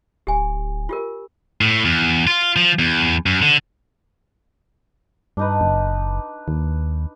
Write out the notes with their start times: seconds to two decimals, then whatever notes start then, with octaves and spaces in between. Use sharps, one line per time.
0.27 D1 G4 G#5
0.89 F4 G4 A#4
1.61 A2
1.85 E2
2.27 F4
2.56 F3
2.79 E2
3.26 F#2
3.42 D3
5.37 G2 D4 D#4 B4
5.61 F#1
6.48 D#2